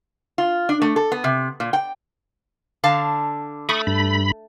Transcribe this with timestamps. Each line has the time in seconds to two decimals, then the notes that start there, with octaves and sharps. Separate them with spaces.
0.38 F4
0.69 D4
0.82 A3
0.96 A4
1.12 B3
1.24 C3
1.60 A#2
1.73 G5
2.84 D3 F5 A5
3.69 A3 B5 C#6 D#6
3.87 G2 B5